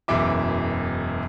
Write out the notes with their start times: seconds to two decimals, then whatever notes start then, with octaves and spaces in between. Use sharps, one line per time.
0.08 E1 F#2 E3 E5 D6